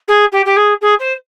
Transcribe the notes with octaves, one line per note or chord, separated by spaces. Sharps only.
G#4
G4
G4
G#4
G#4
C5